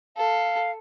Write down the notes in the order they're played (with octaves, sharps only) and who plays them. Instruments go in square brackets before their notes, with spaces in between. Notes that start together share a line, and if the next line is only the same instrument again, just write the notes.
[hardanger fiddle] A4 [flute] F5